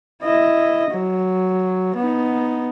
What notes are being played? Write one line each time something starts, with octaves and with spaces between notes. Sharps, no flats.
E4 D#5
F#3
B3 D#4